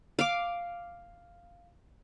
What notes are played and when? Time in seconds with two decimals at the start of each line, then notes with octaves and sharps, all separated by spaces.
0.19 F5 D6